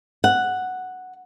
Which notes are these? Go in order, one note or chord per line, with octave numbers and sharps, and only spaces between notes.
F#5